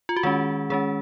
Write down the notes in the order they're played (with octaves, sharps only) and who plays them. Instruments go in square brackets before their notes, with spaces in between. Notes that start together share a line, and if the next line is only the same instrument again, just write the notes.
[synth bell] F4
F#4
D#3 G#3 C#4 G#4
D#3 G#3 C#4 G#4